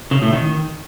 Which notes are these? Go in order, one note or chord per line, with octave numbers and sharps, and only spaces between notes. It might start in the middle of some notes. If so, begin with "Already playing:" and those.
C#3
A2
D#3